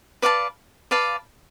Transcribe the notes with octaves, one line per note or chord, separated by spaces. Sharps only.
B4 D5 F5 A5
B4 D5 F5 A5